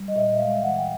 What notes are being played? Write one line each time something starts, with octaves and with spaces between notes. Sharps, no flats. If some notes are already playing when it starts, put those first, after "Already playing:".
Already playing: G3
D#5
A#2 E5
E5
G#3 F5
E3 F#5
G5